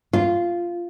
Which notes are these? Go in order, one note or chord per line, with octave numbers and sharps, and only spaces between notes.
F4